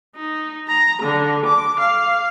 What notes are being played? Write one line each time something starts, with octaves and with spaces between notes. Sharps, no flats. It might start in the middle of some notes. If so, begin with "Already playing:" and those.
D#4
A#5
D3
D6
F5